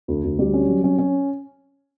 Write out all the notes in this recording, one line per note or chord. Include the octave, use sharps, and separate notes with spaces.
D2
D2
G3
C#4
F#3
C#4
C#4